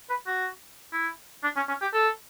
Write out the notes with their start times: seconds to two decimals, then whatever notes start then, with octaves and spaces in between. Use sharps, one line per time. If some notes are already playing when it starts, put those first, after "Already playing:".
0.10 B4
0.27 F#4
0.93 E4
1.44 D4
1.56 C#4
1.69 C#4
1.82 G4
1.94 A4